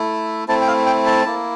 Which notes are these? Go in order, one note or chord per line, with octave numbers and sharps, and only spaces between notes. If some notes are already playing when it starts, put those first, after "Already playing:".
Already playing: A3 E4
A3 C4 E4 A5
G5
F5
G5
A5
A#3 E4